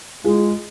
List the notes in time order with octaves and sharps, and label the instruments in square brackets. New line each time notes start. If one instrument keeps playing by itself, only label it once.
[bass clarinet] G#3 [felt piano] F4 G#4